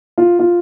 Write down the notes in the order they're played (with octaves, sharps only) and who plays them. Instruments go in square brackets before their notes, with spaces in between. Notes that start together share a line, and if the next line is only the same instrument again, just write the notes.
[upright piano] F4
F4